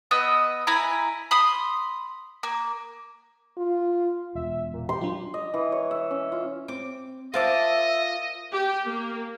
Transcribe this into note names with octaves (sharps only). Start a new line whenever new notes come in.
B3 D#5 E6
E4 G#5 A#5 B5
B5 C6 D#6
A#3
F4
E1 E5
A#2
G4 C6
F#3 D4 F4
D#5
E3
C#5
E5
C#4
F4
C4 D6
F4 A#4 C5 D#5 E5 A5 D6
G4
A#3